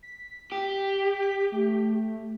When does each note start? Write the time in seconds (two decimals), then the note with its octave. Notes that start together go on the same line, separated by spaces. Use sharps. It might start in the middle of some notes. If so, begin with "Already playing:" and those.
0.03 B6
0.52 G4
1.22 B6
1.52 A3